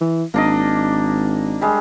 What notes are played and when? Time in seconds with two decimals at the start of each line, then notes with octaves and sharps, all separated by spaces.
0.01 E3
0.34 G#1 A#3 D4 D#5
1.61 G3 G#3